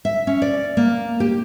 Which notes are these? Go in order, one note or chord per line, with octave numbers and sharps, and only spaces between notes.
E5
C#4
D5
A#3
G4